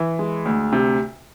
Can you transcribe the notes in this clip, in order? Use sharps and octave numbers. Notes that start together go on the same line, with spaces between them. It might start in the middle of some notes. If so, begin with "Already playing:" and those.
Already playing: E3
G#3
D2
C3